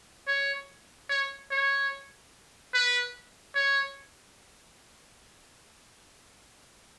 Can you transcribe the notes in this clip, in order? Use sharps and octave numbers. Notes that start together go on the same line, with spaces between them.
C#5
C#5
C#5
B4
C#5